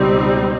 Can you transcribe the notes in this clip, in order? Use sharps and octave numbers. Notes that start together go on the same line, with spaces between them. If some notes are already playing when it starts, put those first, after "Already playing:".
Already playing: C#2 B2 G3 C4 D#4